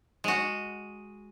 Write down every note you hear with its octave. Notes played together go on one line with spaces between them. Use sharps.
G#3 F#4